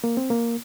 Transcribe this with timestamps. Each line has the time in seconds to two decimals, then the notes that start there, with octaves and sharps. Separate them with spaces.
0.04 A#3
0.17 C4
0.30 A#3